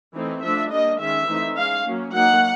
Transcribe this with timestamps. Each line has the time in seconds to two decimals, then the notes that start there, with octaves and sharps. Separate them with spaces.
0.14 E3 A3 C4 D#4
0.42 F3 A3 D4 E5
0.71 G3 A#3 D4 D#5
0.99 D#3 G#3 C#4 E5
1.28 E3 A3 C4 D#4
1.56 G#3 C#4 F5
1.85 F#3 A#3 C#4
2.12 F#3 A#3 D#4 F#5